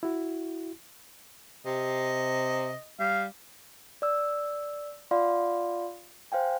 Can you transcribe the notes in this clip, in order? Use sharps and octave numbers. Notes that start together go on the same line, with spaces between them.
E4 F#4
C3 D#5
G3 F5
D5 E6
F4 D5 F5 F#5 B5 C6
C5 F5 G5 G#5